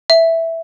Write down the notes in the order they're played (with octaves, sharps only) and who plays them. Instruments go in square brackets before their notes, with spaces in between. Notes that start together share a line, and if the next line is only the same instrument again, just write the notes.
[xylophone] E5